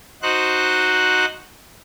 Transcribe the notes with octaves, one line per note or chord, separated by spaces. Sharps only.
D#4 F#4 C5 F#6